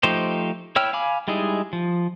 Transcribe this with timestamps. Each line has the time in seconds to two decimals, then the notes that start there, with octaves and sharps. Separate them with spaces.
0.03 F3 A3 D#4 G4 C5
0.76 E4 C#5 G5 E6 F6
0.93 F5 G#5 B5 D6
1.28 G3 G#3 D#4 E4 G#4
1.73 F3